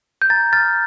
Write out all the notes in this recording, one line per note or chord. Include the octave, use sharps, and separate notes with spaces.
G6
A#5 A6
F6 A6